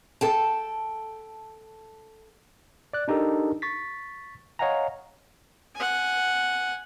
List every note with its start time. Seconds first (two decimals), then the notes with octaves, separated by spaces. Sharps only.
0.21 A4 G5 A5
2.93 D5 F#6
3.08 D4 D#4 G4 A4 A#4
3.62 C#6 A6 B6
4.59 C#5 D#5 F5 F#5 G#5 A#5
5.75 F#5 G#5